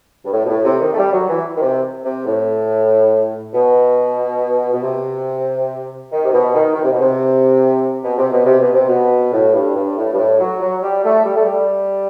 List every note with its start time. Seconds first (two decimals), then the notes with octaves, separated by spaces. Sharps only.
0.25 G2
0.32 A2
0.45 B2
0.49 A2
0.65 C3
0.81 D#3
0.93 A3
0.98 G3
1.13 F#3
1.29 E3
1.57 D#3
1.62 C3
2.05 C3
2.26 A2
3.54 B2
4.73 B2
4.82 C3
6.11 D#3
6.24 C3
6.32 B2
6.54 D#3
6.75 D#3
6.83 C3
6.92 B2
7.00 C3
8.04 B2
8.18 C3
8.32 B2
8.46 C3
8.60 B2
8.73 C3
8.87 B2
9.33 A2
9.54 G2
9.76 G2
9.97 A2
10.13 G2
10.18 A2
10.40 F#3
10.61 F#3
10.82 G3
11.04 A3
11.25 G3
11.35 A3
11.44 G3